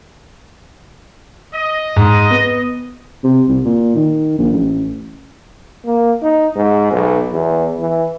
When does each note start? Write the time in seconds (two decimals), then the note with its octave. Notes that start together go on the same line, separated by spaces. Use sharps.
1.53 D#5
1.96 G#2
2.30 B3
3.24 C3
3.49 C2
3.65 A#2
3.95 D#3
4.39 A#1
4.53 A1
5.85 A#3
6.22 D#4
6.56 G#2
6.92 B1
7.33 E2
7.79 E3